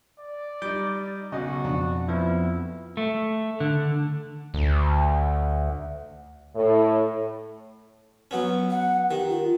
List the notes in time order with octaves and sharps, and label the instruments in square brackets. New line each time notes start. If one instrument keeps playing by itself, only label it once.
[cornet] D5
[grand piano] G3 D#4 [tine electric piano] D6 G6
[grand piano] B1 D#5 [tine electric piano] C#3 [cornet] F#4
[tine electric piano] F2 B2 [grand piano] D4
[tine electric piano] F2 F3 B3 [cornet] E4
[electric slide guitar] A3
D3
[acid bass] D2
[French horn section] A2
[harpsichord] F#3 B3 C#4
[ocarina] F#5
[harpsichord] D#3 [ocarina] G4
[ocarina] F4